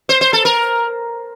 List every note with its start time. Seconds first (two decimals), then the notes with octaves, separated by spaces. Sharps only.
0.09 C5
0.21 C5
0.33 A4
0.45 A#4